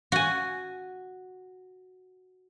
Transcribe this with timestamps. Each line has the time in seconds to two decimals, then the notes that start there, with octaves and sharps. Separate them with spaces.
0.12 F#4 G#5